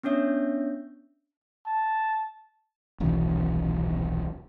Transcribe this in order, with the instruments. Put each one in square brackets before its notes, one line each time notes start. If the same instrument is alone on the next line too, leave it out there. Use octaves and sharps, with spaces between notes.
[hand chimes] B3 C#4 D4 C#5 E5
[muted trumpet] A5
[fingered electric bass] D#1 B1 C#3 E3